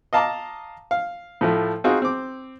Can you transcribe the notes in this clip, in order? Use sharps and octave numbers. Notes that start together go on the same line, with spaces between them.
D#5 F5 A5 A#5 D6
F5
A2 F3 A3
C4 D#4 F4 F#4 G#4
C4 D6